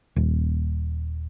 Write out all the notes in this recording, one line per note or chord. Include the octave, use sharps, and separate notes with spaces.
D#1